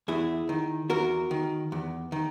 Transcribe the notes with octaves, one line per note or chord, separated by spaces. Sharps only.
E2 E4 G#4
D#3
E2 F#4 A#4
D#3
E2
D#3